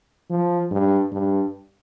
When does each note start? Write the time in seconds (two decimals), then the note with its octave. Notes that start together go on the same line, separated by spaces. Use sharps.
0.30 F3
0.71 G2
1.12 G2